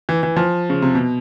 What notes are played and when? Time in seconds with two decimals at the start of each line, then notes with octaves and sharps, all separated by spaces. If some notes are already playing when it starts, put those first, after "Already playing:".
0.09 E3
0.23 E3
0.36 F3
0.70 C#3
0.82 C3
0.95 B2